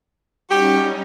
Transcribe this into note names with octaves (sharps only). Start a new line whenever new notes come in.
G3 C#4 D#4 F#4 G4